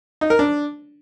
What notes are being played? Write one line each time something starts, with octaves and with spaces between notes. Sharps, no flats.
D#4
A#4
D4